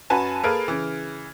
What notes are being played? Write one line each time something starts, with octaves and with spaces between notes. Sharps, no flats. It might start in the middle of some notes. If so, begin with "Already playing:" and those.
F#2 F#4 B4 G#5 A5
A#3 G#4 A4 B4 F6 D7
C#3 E3